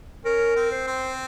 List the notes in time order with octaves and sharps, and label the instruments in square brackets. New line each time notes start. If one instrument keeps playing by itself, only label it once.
[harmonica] C#4 [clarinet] A#4
[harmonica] C4
[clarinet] C5
[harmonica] C4